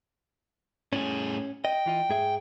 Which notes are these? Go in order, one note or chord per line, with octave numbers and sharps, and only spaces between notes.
A2 C#4 G#4
D#5 G5
E3 F4 D#5
G#2 G#4 E5